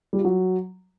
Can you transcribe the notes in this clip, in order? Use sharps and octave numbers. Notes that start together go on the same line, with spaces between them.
G3
F4
F#3